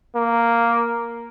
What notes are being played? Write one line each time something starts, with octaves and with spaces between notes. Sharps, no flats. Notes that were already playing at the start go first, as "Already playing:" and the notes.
A#3